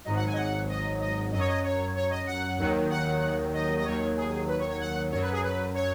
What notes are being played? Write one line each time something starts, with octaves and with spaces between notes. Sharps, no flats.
G#1 G#2 F#3 D#5
F#5
G#5
D#5
F#5
D#5
D#5
F#2 F#3 D#5
C#5
D#5
C#5
C#5
D#5
F#5
D#2 D#3 F#3
F#5
D#5
D#5
D#2 D#3 F#3 C#5
G#4
B4
C#5
C#5
F#5
F#2 F#3 C#5
B4
G#4
B4
C#5